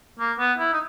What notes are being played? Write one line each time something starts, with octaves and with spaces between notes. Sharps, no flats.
A#3
B3
E4
D#4